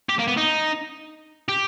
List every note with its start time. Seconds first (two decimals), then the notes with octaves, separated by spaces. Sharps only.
0.09 G4
0.19 A#3
0.28 B3
0.37 D#4
1.48 G4